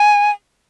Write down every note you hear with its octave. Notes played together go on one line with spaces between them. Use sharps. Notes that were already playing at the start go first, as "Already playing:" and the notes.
Already playing: G#5